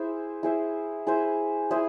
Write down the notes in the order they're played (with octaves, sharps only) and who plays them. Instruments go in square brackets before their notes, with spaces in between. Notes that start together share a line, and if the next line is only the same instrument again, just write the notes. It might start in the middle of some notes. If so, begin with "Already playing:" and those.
Already playing: [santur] E4 G#4 C5 E5
E4 G#4 C5 E5
E4 G#4 C5 E5
E4 G#4 C5 E5